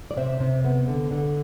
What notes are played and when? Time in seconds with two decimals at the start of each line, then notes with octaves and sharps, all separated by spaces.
0.11 D5
0.17 C3 C5 E5
0.40 C3
0.64 B3
0.88 D3
1.11 D3